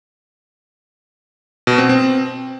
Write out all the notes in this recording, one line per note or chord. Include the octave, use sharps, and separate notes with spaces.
B2
C4
C4